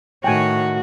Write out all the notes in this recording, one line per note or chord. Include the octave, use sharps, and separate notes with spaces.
A2 D#3 F#4 C#5 G5 G#5